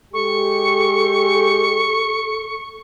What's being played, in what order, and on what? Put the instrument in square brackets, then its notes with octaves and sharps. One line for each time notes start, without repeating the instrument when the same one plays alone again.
[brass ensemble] G#3 G4 [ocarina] A4 [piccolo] C#6